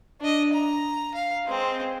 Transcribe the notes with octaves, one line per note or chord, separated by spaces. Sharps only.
D4 D#5
A#5
F5
G#3 C4